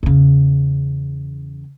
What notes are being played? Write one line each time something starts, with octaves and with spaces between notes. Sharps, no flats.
E2 C#3